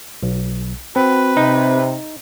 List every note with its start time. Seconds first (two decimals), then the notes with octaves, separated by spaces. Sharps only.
0.23 B1
0.96 C4 F#4 B4
1.37 C3 D#4